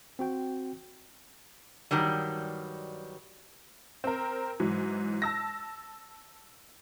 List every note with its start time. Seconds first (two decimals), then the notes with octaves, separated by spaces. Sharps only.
0.19 C4 F#4 G5
1.91 G2 D#3 F#3 G3
4.04 C4 A#4
4.60 G#2 E3 F#3
5.22 A5 E6 A#6